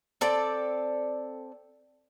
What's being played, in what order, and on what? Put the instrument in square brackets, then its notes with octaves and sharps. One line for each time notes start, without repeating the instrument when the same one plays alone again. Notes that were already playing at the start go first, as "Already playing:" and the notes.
[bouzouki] C4 A4 D5